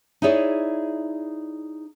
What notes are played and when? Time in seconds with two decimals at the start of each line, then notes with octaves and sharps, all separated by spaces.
0.22 D#4 E4 G#4 C#5 D5